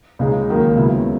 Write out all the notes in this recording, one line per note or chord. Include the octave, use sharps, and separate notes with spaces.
C#2 C#3 G#3 D#4
D#2 D#3 F#3
C#2 C#3 F#3 B3 E4